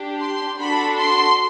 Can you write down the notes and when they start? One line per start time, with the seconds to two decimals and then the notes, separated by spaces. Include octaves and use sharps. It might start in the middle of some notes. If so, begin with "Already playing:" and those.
Already playing: D4 G4
0.20 C6
0.59 D4 F#4 A4 B5
0.98 C6